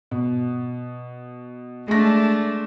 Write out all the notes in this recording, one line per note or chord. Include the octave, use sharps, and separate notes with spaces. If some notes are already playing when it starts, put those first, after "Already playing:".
B2
G#3 A3 D4 A#6